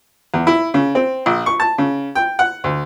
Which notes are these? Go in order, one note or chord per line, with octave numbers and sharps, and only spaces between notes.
E2
E4
C#3
C4
A#1
C#6
A5
C#3
G5
F#5
D2